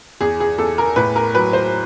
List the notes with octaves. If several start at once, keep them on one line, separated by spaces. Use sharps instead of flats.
E2 G#4
G#4
E2 A4
A#4
A2 B4
A#4
F#3 B4
C5